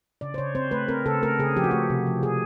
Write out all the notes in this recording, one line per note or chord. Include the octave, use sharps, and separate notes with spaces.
C#3 D5
C5
C#3 C#5
C4 C5
A3 B4
C4 A#4
C#3 A4
A3 A#4
C#3 G#4
F3 G4
F#4
A3 G4
C3
F3
C3 G#4